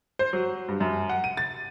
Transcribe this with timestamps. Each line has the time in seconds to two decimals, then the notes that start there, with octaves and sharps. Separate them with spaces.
0.19 C5
0.33 F#3
0.68 G2
0.80 F#2
1.10 F#5
1.24 D#7
1.37 A6